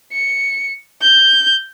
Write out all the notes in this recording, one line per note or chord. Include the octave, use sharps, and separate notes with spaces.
C#7
G6